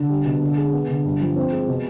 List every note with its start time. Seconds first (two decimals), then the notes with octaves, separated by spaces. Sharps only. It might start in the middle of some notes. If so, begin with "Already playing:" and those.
Already playing: D3
0.09 G3
0.25 B2
0.41 D3
0.57 G#3
0.73 B3
0.88 D3
1.05 G2
1.20 F3
1.36 C4
1.52 G#3
1.68 B2